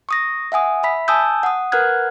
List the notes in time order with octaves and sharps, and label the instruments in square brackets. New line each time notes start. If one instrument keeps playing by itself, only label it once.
[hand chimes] C#6 D#6 A#6
E5 F#5 G#5 D#6
E5 B5 B6
G#5 A5 D#6 E6 G6
F#5 D#6
A#4 B4 F#5 F6 F#6 G#6